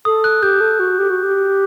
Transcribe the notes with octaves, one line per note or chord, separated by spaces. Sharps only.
A4 D#6
F#6
G4 G6
A4
F#4
G4
F#4
G4